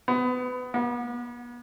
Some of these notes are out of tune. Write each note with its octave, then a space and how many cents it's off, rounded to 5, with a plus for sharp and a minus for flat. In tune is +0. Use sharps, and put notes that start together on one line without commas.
B3 +25
B3 -40